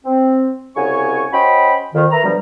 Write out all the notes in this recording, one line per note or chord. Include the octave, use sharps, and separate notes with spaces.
C4
C2 C#3 F#4 C#5 G#5 C#6
C#4 F#4 C5 D#5 G5 B5
F2 D#3
A#4 B4 E5 A#5
G2 B2 D3 F3 G3